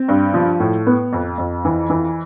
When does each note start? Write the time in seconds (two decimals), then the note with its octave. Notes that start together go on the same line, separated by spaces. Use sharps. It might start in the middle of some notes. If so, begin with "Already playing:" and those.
Already playing: C4
0.08 G2
0.34 F3
0.60 A2
0.87 B3
1.13 F2
1.38 F2
1.65 E3
1.90 E3